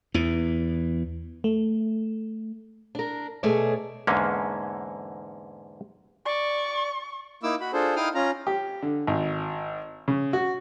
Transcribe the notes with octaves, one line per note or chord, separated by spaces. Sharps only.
E2 E3
A3
D4 A#4
B2 A3 G#4 C#5 D5
E2 G#2 D3 A#3 C#4
D5 C#6
A#3 D#4 E4 D6 E6
F#4 B5
D4 F4 G#4 A4 C5
D#4 E4 F5 G5 D#6 F6
C#4 F4 A#5
G4
D3
G#1
C#3
F#4